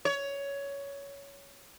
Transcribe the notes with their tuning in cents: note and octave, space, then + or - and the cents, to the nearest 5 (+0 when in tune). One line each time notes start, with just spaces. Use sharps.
C#5 +15